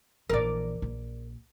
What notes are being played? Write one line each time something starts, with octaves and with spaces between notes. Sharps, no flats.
A#1 E3 A#4 D5
A#1